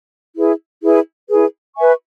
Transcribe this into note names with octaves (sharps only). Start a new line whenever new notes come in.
E4 G#4 B4
E4 G#4 B4
E4 G#4 B4
B4 E5 G#5 C#6